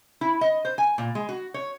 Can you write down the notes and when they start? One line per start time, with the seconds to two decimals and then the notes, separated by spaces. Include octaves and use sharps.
0.21 E4
0.41 D#5
0.65 C5
0.78 G#5
0.98 A#2
1.15 G#3
1.29 F#4
1.54 C#5